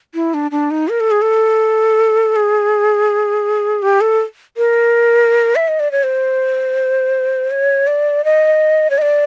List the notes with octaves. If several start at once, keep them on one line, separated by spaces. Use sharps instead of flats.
E4
D4
D4
D#4
A#4
A4
G#4
A4
G#4
G4
A4
A#4
E5
D#5
D5
C#5
C5
C#5
D5
D#5
C#5
D#5
D5